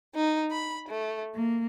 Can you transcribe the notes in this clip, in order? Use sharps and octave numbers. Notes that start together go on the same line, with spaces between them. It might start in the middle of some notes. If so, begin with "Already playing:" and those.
D#4
B5
A3
A#3